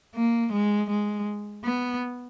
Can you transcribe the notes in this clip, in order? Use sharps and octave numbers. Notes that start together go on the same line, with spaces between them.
A#3
G#3
G#3
B3